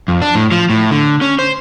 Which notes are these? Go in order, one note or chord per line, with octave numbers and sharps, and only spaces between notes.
F2
D4
A2
F3
A2
D3
C#4
C5